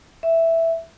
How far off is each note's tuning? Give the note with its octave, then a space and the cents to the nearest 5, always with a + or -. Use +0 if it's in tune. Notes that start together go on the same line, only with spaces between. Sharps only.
E5 +0